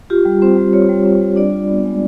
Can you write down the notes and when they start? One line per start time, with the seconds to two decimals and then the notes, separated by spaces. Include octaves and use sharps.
0.10 F4 G4
0.25 G3
0.42 C4 C5
0.57 G3
0.73 F4 C#5
0.89 G3
1.05 C4
1.21 G3
1.36 D4 D5
1.52 F4
1.69 B3
1.85 G#3